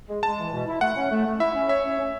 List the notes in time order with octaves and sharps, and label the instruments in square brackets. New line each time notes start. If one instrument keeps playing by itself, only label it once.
[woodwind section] G#3
[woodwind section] G#3 [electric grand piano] A5
[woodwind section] E3
B2
E4
[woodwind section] A3 [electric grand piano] F#5
[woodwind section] C#4
A3
A3
[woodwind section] E4 [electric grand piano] E5
[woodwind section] C#4
[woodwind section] C#5 [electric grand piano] E5
[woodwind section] C#4
C#4